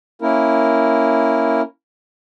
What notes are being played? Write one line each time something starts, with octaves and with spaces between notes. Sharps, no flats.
A#3 C#4 E4 A#4